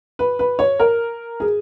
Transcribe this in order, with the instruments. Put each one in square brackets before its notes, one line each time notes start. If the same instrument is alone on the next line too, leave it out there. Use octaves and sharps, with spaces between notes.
[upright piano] B4
B4
C#5
A#4
G#4